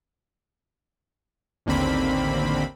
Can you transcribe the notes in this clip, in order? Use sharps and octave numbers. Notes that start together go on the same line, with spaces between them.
A1 D#2 D3 A#3 C4 B5